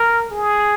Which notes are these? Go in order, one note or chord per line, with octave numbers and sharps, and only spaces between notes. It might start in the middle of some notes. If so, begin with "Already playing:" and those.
Already playing: A#4
G#4